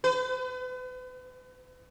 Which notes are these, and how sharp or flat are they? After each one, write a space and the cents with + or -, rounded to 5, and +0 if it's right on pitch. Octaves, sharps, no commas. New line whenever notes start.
B4 +40